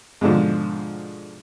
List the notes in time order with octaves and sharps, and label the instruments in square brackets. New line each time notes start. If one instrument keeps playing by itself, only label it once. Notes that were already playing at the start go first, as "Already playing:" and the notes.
[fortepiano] G#2 B2 D3 F3